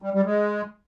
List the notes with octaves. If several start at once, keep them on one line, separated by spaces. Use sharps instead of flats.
G3
G3
G#3